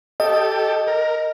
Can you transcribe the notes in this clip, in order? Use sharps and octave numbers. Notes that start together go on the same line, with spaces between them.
G4 A4 D#5
A#4